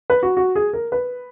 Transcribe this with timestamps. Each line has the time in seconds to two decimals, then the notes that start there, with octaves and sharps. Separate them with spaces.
0.10 B4
0.23 F#4
0.37 F#4
0.55 G#4
0.73 A#4
0.92 B4